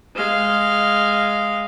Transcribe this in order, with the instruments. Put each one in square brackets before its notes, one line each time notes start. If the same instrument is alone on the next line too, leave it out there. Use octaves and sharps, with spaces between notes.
[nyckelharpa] G#3 F5